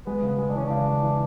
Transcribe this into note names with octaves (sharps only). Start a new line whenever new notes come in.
G#3 B3
C#3
B3
G#3
D4
E3 C#4
C#3 D4
C#3
E3